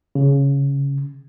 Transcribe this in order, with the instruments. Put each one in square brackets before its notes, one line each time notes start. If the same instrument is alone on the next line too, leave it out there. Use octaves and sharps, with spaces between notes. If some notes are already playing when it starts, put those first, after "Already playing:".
[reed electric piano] C#3